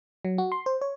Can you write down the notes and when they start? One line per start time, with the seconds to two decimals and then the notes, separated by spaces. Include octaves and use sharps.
0.25 F#3
0.38 F#4
0.52 C6
0.66 C5
0.81 C#5